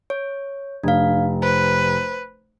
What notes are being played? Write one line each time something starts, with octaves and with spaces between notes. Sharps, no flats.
C#5
F1 D4 F5
B4 C5